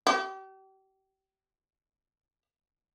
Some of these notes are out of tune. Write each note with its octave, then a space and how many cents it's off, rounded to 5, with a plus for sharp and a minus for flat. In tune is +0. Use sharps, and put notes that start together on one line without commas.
G4 -35